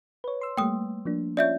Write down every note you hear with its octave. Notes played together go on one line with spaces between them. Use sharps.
B4 C#5
C6 E6
G3 A3 A#3 G5 D#6
F3 A#3 D4
C#4 F4 C#5 D5 E5 G6